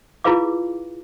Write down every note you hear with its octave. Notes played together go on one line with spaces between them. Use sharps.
E4 F4 G#4 B4 F5 D6